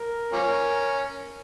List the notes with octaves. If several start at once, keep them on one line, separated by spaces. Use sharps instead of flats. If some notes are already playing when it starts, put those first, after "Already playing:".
Already playing: A#4
F3 A#3 C#4